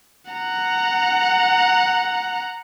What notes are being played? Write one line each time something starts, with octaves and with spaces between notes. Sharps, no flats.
F#5 A#5